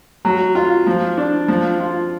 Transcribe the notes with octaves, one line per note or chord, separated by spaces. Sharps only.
F#3
F4
F3
D4
F3
F4